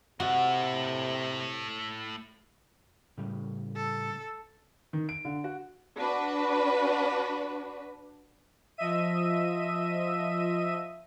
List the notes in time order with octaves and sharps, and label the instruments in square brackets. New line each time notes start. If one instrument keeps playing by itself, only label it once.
[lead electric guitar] A2 A3 [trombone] C3 [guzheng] F#4
[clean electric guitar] A2 C#3 G3
[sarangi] A4
[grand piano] D#3
D7
D3
F#4
[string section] D4 F#4 B4
[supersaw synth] F3 D#5 E5 D#7